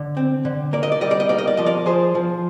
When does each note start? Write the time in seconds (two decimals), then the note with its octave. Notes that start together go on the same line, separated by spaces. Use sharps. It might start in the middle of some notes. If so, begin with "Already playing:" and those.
Already playing: D3
0.17 C4
0.45 D3
0.73 A#3 D5
0.83 D#5
0.92 D5
1.01 G3 D#5
1.11 D5
1.20 D#5
1.29 A#3 D5
1.38 D#5
1.47 D5
1.57 F3 D#5
1.66 A#4 D5
1.86 F3 G#4 C5
2.15 F3